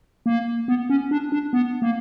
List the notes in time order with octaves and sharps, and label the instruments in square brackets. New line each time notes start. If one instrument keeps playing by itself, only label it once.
[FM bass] A#3
B3
C#4
D4
D4
B3
A#3